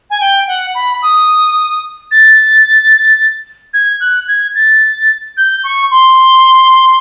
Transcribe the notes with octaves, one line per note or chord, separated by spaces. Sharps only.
G#5
G5
F#5
B5
D#6
A6
G#6
F#6
G#6
A6
G6
C#6
C6